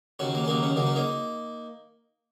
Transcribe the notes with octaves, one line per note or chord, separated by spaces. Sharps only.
D#2 C#3 F#3 C#4
A#3
C#4
D#2 C#3 F#3 A#3
C#4
C#2 C#3 F#3 A#3
C#4
A#3 D#4